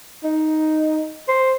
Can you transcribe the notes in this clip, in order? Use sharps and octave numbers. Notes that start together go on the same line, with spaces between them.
D#4
C5